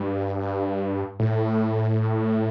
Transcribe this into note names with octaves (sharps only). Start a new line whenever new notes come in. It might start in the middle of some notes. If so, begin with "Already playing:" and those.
Already playing: G2
A2